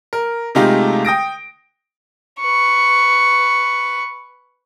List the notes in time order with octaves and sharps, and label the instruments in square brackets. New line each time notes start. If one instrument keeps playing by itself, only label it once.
[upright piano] A#4
C3 G#3 A3 D#4 F4 G4
G5 D#6 A#6 D7
[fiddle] B4 C#6